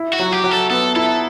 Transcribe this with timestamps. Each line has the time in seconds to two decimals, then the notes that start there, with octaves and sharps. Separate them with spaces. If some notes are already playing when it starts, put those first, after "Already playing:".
Already playing: E4
0.13 F#4
0.19 F#3
0.32 G4
0.44 F#3
0.51 A4
0.70 B3 A4
0.96 E4 A4